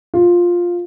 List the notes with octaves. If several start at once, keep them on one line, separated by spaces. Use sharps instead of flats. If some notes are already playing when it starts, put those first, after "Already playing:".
F4